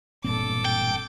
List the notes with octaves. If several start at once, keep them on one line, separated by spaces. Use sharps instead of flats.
E1 G2 A#2 C4 A4 D6
G5